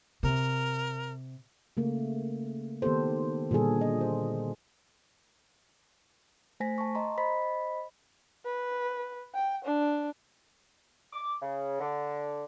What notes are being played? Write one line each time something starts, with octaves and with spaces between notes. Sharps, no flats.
C3 A#4
C#3 A3 A#3
D#3 A#3 B3 G4 A4 C5
A#2 D3 G3 G#4 A4
D#5
C5
A3 C5 G#5 A#6 B6
A5 C#6
D#5 A#5 C6
C5 D#5 B5 B6
B4
G5
D4
D6
C#3
D3